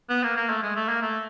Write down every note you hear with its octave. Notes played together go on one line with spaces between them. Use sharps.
B3
A#3
A#3
A3
G#3
A3
A#3
A3